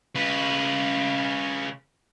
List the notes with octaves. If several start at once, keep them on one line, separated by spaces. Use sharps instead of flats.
C#3 B4